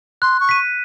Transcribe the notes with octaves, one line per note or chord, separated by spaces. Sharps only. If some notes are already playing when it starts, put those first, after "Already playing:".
C6 F#6
C#6
B6 D#7